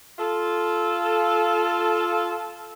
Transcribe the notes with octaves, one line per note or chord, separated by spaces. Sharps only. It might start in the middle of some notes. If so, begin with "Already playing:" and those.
F4 A4